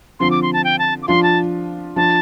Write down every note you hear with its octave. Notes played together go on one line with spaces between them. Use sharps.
D3 F3 C4 F4 C6
D6
C6
A5
G5
A5
D6
F3 D4 F4 C6
A5
F3 D4 F4 A5